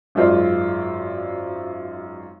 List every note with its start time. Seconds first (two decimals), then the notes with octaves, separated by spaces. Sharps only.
0.15 G#1 F#2 G#3 F4 C5 D5